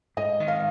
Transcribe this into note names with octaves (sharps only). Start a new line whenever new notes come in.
G#2 D#5
D#3
F5